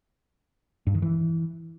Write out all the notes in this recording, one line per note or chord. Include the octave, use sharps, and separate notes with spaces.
G2
D#3
E3